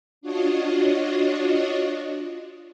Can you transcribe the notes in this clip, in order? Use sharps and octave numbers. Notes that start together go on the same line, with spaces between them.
D4 F4 F#4 C#5 D#5